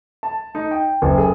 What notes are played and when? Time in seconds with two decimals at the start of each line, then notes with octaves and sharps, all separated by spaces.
0.23 A5
0.55 D#4
0.71 G5
1.02 F#1
1.18 G#4